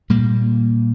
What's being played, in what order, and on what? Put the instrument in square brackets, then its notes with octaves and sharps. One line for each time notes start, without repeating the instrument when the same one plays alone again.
[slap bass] A#2 G3 A#3